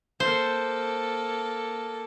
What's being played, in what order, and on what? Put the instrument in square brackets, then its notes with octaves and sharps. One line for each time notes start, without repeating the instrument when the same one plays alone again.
[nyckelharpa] A#3 A4 [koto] C5